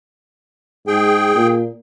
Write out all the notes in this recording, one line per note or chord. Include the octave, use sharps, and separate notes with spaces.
G#2 G#4 G5
A#2